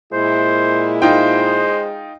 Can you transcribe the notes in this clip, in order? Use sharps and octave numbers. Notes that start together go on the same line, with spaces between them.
A#2 G#3 E4 C5
D#4 F4 C5 G5